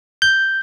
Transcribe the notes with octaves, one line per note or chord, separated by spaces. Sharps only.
G6